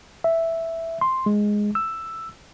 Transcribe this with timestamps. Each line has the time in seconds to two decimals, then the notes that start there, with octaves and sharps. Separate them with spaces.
0.24 E5
1.01 C6
1.26 G#3
1.75 E6